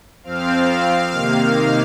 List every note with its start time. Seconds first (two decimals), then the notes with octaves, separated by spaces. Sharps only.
0.23 F2 F3 C4 F5
1.10 C3 D#3 A#3